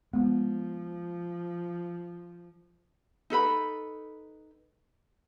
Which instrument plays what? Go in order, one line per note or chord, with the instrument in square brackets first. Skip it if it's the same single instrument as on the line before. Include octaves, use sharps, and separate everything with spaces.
[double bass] F3 [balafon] G#3 [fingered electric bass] B3
[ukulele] D#4 A4 B4 B5